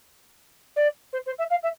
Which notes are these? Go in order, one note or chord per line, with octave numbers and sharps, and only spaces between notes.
D5
C5
C5
E5
F5
E5